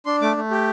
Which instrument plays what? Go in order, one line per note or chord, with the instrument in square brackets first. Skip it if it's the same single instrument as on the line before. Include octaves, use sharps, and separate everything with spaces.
[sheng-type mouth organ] D4 C6
A3 D6
A3
G4